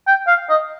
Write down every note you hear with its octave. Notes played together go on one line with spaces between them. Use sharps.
G5
F5
D#5